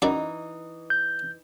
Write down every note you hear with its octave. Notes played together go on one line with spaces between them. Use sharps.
F#2 E3 D#4 F#4 D5
G6